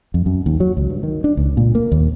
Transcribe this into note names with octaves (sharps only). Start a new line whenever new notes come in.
F2
F#2
D#2
F#3
C#2
G2
D#3
D4
C#2
A#2
A#3
D#2